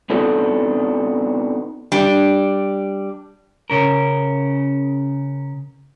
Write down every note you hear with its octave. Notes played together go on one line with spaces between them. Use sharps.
B3 C4 D4 D#4 F#4 A4
G3 D4
C#3 C#4 A#4